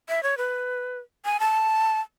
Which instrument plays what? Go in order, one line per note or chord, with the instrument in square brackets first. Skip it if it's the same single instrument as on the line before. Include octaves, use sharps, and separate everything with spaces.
[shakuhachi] E5
C#5
B4
G#5
A5